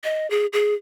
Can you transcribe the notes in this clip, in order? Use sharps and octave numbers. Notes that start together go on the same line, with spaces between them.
D#5
G#4
G#4